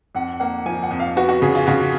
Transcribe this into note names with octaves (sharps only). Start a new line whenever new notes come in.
F2 F#5
A#3 F#5
F3 G#5
F#5
F2
F5
B3 F#4
F#4
C#3 G#4
F4
C#3 F#4